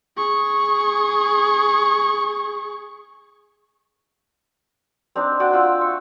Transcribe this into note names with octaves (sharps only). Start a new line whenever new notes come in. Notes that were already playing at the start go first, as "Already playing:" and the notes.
G#4 C#6
C4 D4 D#4 C5
F#4 F#5 G5 A5
F4 E6
E5 C#6